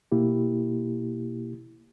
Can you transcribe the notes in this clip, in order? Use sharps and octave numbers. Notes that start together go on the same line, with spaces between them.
B2 A#3 E4 G4